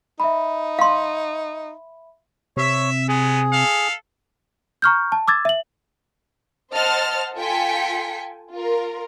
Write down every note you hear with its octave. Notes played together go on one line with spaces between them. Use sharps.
D#4 E5 B5
F5 C6
C3 C#5 E5
G#3 B3 G#4
A4 F5
A#5 C#6 F6 G6
A5
D6 E6 G#6 A6
E5 F#7
C5 D#5 F#5 A5 F6 A6
F4 A4 G5 G#5 B6 C#7
F4 A#4